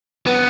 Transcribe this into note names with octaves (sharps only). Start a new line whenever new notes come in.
B3